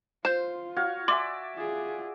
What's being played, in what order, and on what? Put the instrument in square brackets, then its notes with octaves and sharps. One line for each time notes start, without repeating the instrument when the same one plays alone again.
[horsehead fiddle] F4 [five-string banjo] C5 [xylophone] G6 E7
[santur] F#4 C#5 F5
[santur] D5 E5 G#5 [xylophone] C6 D6
[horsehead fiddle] F4 G#4